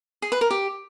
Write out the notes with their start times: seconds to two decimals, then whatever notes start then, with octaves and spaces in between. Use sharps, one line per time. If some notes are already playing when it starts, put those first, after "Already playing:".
0.22 G#4
0.32 B4
0.41 A#4
0.51 G4